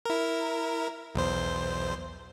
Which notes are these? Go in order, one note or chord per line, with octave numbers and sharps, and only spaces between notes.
E4 A#4
B1 E2 C5